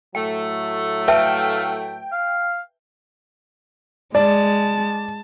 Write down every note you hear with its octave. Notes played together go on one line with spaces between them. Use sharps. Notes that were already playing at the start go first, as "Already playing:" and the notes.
A2 F#3 A3 G5
B4 E5 F5 G5 A5
F5
G#3 D5 A5